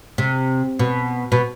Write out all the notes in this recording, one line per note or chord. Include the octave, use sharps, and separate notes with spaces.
C3
B2
B2